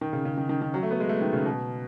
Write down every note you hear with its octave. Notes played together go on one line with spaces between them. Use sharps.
D#3
C#3
C#3
D#3
D#3
D#3
F#3
A3
B3
G#3
A3
D#3
C#3
B2